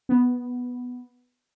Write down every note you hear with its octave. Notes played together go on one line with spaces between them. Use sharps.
B3